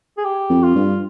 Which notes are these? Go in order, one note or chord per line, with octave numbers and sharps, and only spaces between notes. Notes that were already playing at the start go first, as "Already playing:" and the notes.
G#4
G4
F2
F4
G2